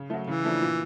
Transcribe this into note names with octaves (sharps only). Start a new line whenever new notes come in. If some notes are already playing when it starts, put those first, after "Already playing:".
Already playing: C#3
F#3 A3
C#3 E3
F3 A3 D4
A#2